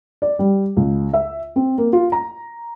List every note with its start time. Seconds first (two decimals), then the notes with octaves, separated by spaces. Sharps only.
0.22 D5
0.39 G3
0.76 C#2
1.13 E5
1.56 C4
1.78 A#3
1.93 F4
2.12 A#5